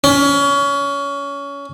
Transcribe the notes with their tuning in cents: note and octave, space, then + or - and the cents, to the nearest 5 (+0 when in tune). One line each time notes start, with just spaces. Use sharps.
C#4 +25